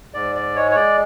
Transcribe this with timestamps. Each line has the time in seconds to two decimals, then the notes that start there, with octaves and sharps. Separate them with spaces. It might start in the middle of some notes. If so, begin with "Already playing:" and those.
0.14 G#2 D5
0.35 D5
0.55 G#3 C#5
0.71 C#5
0.75 D5